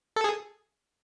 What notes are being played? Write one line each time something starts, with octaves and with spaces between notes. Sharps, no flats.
A4
G#4